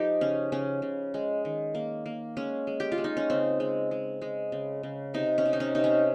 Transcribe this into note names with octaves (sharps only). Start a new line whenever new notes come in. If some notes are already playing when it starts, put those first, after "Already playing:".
Already playing: F3 G#3 D#4 G4
C#3 C#4
C#3 C#4
C#3
G#3
D#3
A#3
A#3
G#3 C#4
G#3
G4
F4
G#3
D#4
C#4
C#3 C4
G#3
G#3
G#3
C#3
C#3
C3 D#4
C#4
C3
D#4
C#4
C3 D#4
C#4